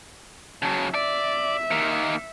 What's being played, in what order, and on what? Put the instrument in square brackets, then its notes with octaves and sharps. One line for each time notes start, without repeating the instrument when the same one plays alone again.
[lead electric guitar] C#3 F#3 [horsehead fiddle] A5
[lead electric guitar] D5 [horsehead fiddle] E5
[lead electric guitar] D#3 A#3